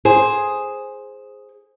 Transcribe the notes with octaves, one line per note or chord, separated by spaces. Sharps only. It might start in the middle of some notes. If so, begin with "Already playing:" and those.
G#4 C5